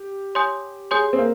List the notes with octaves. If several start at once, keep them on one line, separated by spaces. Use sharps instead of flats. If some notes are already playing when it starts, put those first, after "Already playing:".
Already playing: G4
C#5 G#5 C6 D#6 G6
G#4 C#5 G#5 C6 D#6 G6
C4
A#3